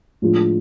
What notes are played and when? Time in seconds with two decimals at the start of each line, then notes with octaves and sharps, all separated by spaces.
0.22 A2 F3 G#3 D4 F4